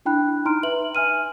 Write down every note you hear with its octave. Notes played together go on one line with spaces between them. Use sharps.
D4 E4 G5 B5 F#6
D#4 A#5 C6 F6 D7
B4 E5 F#7
E5 G#5 F6 D#7